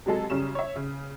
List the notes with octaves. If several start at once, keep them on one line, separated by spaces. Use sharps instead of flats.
C3 F#3 G#3 A4
F#2 C#3 G3 C#4 E7
C#5 E5
C#3